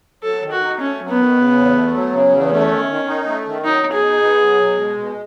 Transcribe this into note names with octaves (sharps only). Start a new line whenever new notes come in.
F#3 A4
D#3
F#4
D#4
A3 C#4
F#3
B3
D#3
C#3
E2
A3
F#3
C#3
E2
A3 C#4
D#3
D#3
D#4
A3
D#3
F#3 D#4
B2
G#4
D#4
B3
F#3
B2
G#3
B2